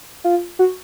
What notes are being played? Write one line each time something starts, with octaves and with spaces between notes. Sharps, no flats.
F4
F#4